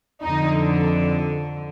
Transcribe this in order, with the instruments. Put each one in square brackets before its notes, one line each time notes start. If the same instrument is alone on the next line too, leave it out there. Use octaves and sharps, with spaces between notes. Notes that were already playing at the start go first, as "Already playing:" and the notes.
[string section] F2 D3 D#4